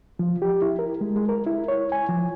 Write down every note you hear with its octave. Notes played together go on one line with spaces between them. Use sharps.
F3
G4
E4
A#4
G#3
G#3
A#4
E4
C#5
G#5
F3